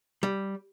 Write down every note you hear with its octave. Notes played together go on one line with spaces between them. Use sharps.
G3